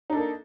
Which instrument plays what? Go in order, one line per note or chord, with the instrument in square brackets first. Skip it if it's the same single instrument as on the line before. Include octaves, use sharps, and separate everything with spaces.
[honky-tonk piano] D#4
D4
A4
A#3